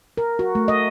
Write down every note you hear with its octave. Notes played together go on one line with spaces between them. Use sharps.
A#4
F#4
A3
D#5